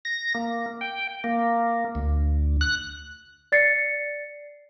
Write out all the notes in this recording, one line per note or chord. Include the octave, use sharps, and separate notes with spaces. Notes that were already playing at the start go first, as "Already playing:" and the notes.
A#6
A#3
G5
A#3
D2
F#6
D5 A6 C7 C#7